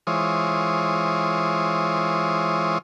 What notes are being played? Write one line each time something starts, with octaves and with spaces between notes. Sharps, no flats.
E3 G#3 F4 C5 C#5 D#6